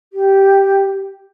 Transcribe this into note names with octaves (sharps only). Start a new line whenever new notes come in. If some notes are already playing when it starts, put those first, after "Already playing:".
G4